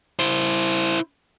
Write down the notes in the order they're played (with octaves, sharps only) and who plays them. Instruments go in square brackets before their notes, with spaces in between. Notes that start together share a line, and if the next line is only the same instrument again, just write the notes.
[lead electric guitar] E4 C5